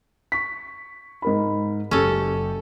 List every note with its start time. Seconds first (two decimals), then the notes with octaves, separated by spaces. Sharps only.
0.32 C#6 B6
1.22 G#2 A#4 B5
1.91 F#1 C#4 G4 A4